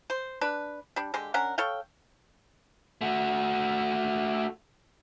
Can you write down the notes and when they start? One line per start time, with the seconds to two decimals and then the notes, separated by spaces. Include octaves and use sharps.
0.10 C5
0.41 D4 B4
0.96 G3 D4
1.14 D3 G#3 G4
1.34 C#4 D4 A#4 F#5
1.58 A4 C#5 F5 G5
3.01 A3 F#4